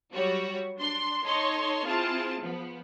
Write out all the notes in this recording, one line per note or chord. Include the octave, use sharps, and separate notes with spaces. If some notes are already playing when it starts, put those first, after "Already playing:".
F#3 G3 F#4 C#5
D4 C6
D#4 A4 C#5 D#5 C6 C#6
C4 E4 F4 G#4 A5
F3 B3